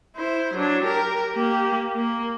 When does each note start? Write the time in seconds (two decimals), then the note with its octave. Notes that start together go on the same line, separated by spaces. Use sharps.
0.16 E4 C5
0.54 F#3 D4
0.84 G4 A#4
1.33 A#3 G4
1.95 A#3